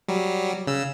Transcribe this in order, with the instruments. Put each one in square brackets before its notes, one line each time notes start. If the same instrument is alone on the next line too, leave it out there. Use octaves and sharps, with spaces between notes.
[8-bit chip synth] F#3 G3
C#3 E6